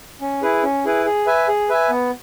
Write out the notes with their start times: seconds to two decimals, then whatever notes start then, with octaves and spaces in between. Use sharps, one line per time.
0.21 C#4
0.42 E4 G#4 B4
0.63 C#4
0.85 E4 G#4 B4
1.05 G#4
1.26 B4 E5 G#5
1.48 G#4
1.69 B4 E5 G#5
1.90 B3